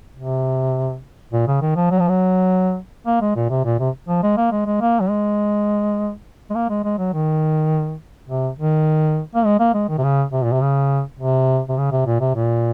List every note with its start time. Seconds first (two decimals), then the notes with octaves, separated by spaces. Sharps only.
0.17 C3
1.33 A#2
1.47 C#3
1.62 D#3
1.76 F3
1.91 F#3
1.99 F3
2.08 F#3
3.06 A#3
3.22 G#3
3.36 A#2
3.50 C3
3.65 A#2
3.79 C3
4.08 F3
4.23 G#3
4.37 A#3
4.52 G#3
4.66 G#3
4.81 A#3
5.00 F#3
5.10 G#3
6.50 G#3
6.55 A#3
6.70 G#3
6.84 G#3
6.98 F#3
7.13 D#3
8.29 C3
8.59 D#3
9.35 A#3
9.45 G#3
9.60 A#3
9.74 G#3
9.89 D#3
9.98 C3
10.03 C#3
10.33 C3
10.44 A#2
10.52 C3
10.61 C#3
11.19 C3
11.69 C3
11.78 C#3
11.92 C3
12.06 A#2
12.21 C3
12.35 A#2